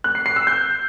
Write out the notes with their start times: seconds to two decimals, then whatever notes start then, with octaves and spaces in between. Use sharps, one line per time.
0.04 F#6
0.15 C7
0.26 C7
0.36 E6
0.47 G6